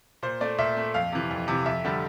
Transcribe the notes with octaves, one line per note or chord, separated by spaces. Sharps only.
A#2 C5
A3 D5
A#2 E5
A3
F2 F5
C3 E3
F2
C3 E3
F2 E5
D3 G3